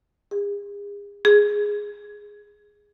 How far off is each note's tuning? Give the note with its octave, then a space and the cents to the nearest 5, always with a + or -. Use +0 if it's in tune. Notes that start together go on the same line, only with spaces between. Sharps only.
G#4 -40
G#4 +0